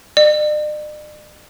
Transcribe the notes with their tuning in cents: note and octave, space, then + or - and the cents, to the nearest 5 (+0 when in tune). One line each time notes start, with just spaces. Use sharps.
D5 +45